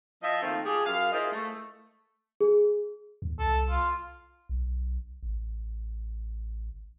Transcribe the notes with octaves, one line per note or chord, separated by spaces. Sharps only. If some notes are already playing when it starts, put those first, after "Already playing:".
F3 D#5 E5
D#3 F3 A3 A#3 C4
F3 G4 G#4
F#2 F5
E4 F4 G#4 A#4 C5 D#5
A3
G#4
D#2
C2 A4
F4
B1
A1